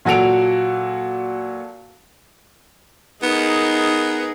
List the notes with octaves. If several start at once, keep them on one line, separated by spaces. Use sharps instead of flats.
A#2 F#3 F#4 A4 D7 F7
B3 D#4 G#4 A#4